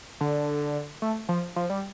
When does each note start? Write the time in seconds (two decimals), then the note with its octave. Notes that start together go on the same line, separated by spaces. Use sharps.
0.21 D3
1.02 A3
1.29 F3
1.56 F3
1.70 G3